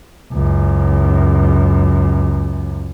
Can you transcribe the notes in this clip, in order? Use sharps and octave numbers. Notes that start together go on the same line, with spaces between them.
C#2 F#2